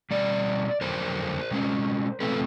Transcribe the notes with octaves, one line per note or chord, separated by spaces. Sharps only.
B2 G3 D5
F2 D3 F#3 A#4 C5
B2 G#3 C#4
C3 F3 A3 C4 A4 B4